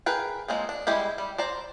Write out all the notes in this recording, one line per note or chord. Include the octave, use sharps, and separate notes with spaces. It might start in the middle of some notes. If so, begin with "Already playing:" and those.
G#4 A#4 B4 G5
F3 G#3 A#3 C4
D4
G3 G#3 E4 G4
G3
C5 D5 A#5